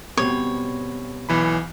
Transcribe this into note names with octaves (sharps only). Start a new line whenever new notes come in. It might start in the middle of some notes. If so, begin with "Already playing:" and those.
B2 G3 C4 C#5
B1 E3 B5